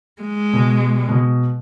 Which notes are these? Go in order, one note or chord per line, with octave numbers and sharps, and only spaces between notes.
G#3
B2
B2